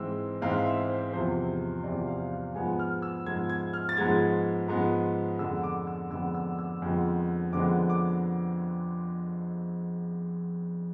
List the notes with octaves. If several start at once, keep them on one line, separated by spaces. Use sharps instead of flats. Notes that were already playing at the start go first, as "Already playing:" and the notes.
Already playing: G#2 E3 G#3 C4 E6
G#2 E3 G#3 C4 F5
E5
C5
E2 C3 F3 C5
E2 C3 F3 D5
F5
F5
G#2 F3 G#3 B3 G#5
F6
E6
G#2 F3 G#3 B3 G#6
G#6
F6
A6
G#2 F3 G#3 B3 G#6
G#2 F3 G#3 B3
F2 D3 G#3 B3 E6
D6
E6
F2 D3 G#3 B3 E6
E6
E6
F2 D3 F3 G#3 B3
F2 D3 F3 G#3 B3 D6
D6